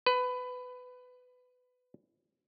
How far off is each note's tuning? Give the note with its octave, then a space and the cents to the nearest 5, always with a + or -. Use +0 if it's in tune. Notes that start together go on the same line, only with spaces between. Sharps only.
B4 +20